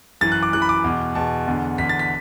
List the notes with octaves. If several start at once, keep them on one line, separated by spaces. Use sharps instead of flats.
F#2 E3 A6
F#6
D6
F#2 E3 F#6
B5
D6
E2 B2
E2 B2 A5
E2 D3
E2 D3 B6
A6
B6